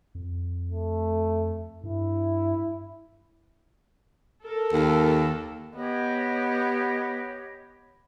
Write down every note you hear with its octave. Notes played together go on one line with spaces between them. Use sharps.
F2
A3
G2 E4
A4 A#4
D#2
B3 G4 C#5 D#5